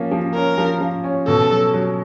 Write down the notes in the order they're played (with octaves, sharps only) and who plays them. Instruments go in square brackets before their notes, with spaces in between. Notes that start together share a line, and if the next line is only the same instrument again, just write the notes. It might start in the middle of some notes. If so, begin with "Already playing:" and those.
Already playing: [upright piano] F3 A#3 C#4
F3
[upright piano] C#4 [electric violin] A#4
[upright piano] F3
F3
C#4
[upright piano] B2 [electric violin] A4
[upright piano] F#3
F#3